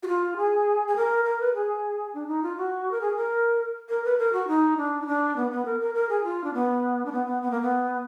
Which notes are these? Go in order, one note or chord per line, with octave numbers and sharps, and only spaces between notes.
F#4
F4
G#4
G#4
A#4
A#4
B4
G#4
D4
D#4
F4
F#4
A#4
G#4
A#4
A#4
B4
A#4
F#4
D#4
D4
D#4
D4
B3
B3
A#4
A#4
A#4
G#4
F4
D4
B3
D4
B3
B3
B3
A#3
B3